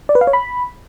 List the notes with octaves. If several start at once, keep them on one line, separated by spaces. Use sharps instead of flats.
D5
B4
F5
C#5
B5